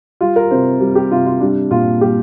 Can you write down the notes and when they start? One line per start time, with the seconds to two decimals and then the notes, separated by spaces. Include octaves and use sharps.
0.21 G3 F4
0.36 A#4
0.51 C3 C5
0.80 G3
0.95 G4
1.11 C3 F4
1.26 F4
1.40 G3 D4
1.71 A#2 F4
2.01 G3 G4